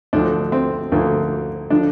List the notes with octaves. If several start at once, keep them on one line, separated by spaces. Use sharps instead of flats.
D2 D3 F3 D4
C4
D2 D3 F3 A#3
D3 F3 D4